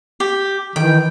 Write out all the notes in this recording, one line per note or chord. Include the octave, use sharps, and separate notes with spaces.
G4
D#3 E3 G5